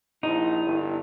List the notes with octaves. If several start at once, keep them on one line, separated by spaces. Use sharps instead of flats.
A#1 D#4 E4
G1